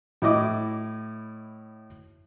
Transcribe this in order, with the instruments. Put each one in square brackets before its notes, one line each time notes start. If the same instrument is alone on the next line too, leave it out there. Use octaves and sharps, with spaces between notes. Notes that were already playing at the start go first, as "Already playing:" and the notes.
[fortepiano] A2 E4 D#5 D6